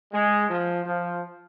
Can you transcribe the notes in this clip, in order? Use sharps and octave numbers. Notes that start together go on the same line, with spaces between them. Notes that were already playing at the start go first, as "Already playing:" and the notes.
G#3
F3
F3